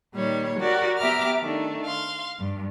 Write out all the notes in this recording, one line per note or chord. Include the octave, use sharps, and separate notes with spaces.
A#2 D#3 G3 C#5
F#4 G4 A#4 D5
B3 G4 E5 A#5 D6 F6
D#3 A3 D4
F5 C6
G2